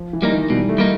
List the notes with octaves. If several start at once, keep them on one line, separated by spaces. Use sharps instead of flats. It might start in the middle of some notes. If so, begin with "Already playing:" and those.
Already playing: F3
E3
G3 A#3 D#4
D#3
B2 G3
A3
G3 A#3 D#4